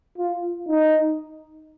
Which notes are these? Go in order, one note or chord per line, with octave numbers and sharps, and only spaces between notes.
F4
D#4